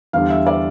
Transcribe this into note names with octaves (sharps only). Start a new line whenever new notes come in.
E2 D3 G3 F5
E5
D5